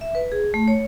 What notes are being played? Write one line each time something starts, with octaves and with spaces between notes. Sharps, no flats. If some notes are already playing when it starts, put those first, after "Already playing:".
E5
B4
G#4
A3
C#5